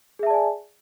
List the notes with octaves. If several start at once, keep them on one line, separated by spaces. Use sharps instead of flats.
G#4 D5 E5 G#5 A5